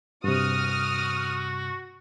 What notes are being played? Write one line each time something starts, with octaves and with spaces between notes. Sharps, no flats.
G2 C3 F#4 D#6 F6